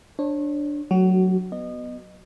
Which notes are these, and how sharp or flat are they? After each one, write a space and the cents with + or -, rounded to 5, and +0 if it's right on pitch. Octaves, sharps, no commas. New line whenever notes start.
D4 +0 C#5 -35
F#3 +0 A3 +0 F#4 +25
B3 +0 D#5 -25